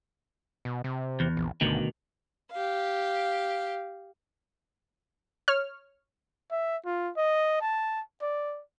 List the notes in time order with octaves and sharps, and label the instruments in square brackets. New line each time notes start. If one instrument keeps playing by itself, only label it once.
[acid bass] B2
C3
[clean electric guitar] E2
[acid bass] A#1
[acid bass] G1 [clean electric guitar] D2 B2 D#3
[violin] G4 F5
[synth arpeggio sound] C#5 F6
[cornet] E5
F4
D#5
A5
D5